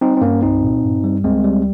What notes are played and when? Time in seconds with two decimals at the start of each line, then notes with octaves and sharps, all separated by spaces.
0.01 G3 C4 D#4
0.17 C4
0.21 G2 A#3 C#4
0.42 C2 C4 D#4
0.63 A#2
0.83 G2
1.04 G3
1.24 C#2 G#3 C4
1.44 G3